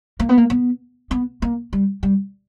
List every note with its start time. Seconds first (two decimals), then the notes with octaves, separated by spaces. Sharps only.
0.20 A#3
0.29 B3
0.38 A#3
0.50 B3
1.11 B3
1.42 A#3
1.73 G3
2.03 G3